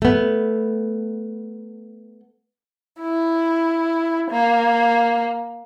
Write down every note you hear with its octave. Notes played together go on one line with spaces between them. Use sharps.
A3 B3
E4
A#3